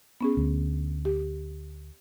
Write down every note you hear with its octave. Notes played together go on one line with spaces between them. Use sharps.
B3 C#4 G#4
D2
G4